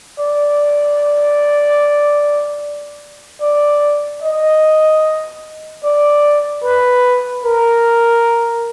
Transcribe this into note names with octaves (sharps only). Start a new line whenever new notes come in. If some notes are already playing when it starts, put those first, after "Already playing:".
D5
D5
D#5
D5
B4
A#4